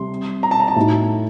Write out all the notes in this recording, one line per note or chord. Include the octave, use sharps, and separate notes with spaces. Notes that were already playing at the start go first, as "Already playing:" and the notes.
Already playing: C3 G3 C6
A#5
A5
A#5
A5
A2 A3 D#4 F#4